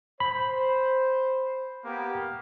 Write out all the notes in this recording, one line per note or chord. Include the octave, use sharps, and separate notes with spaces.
C5 B5
A#3 B3 G4